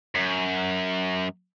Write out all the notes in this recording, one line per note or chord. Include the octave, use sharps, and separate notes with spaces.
F#2